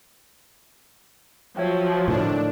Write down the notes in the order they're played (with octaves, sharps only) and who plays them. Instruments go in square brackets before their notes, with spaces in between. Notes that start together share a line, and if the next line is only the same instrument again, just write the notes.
[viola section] F3 F#3 [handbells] C#5 E5 G5
[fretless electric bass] A2 D3 D#3 [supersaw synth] D4